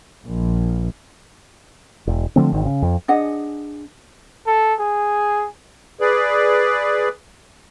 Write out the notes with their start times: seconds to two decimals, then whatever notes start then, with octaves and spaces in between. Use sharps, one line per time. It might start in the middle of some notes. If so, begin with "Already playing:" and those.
0.24 A#1
2.07 E1
2.36 D3 F3 A3 C4
2.52 G#1 D#3
2.66 C#3
2.82 F2
3.08 D4 G#4 D#5 F#5
4.47 A4
4.79 G#4
6.01 G#4 B4 D5